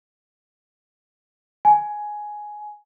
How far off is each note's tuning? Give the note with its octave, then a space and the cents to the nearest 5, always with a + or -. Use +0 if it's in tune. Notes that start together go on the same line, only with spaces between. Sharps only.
G#5 +10